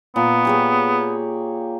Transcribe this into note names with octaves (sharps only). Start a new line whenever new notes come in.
A#2 B3
G4 G#4 C#5